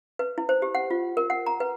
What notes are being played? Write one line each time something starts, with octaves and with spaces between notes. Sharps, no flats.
B4
E4
C5
G4
F#5
F4
A#4
F#5
A#5
B4